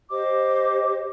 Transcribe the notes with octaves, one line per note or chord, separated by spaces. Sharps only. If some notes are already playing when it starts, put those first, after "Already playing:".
G4 C5 D#5 D6